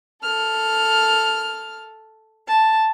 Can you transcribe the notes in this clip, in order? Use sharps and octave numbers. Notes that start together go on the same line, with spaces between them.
A4 F6
A5